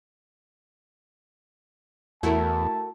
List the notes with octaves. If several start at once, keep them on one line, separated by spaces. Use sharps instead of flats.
E2 A3 E4 F#4 A#4 A5